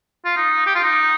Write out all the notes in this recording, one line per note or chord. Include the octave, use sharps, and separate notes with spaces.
F4
D#4
G4
F4
D#4